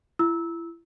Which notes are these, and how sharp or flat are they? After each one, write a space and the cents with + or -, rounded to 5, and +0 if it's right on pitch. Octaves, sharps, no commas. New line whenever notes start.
E4 +35 E6 -20